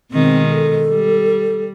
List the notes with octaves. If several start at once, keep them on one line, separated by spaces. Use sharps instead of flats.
B2 D#3 G#3 C4
A4
G3